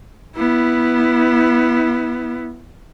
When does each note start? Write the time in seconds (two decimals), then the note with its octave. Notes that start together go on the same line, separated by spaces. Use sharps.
0.36 B3 E4